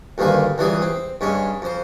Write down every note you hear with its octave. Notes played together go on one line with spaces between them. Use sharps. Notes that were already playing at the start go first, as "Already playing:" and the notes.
D2 G2 D#3 A#3 G#5
C#2 E3 G3 G#4 G#5
C4
G2 G#3 C#4
F2 C5